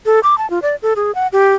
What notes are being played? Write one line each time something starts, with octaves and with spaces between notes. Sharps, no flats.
A4
D6
A5
F4
D5
A4
G#4
F#5
G4